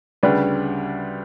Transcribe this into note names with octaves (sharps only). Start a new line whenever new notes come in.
D2 C#3 G3 D4 B4